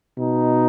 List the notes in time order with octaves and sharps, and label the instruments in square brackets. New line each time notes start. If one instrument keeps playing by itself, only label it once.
[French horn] B2 [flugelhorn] D#4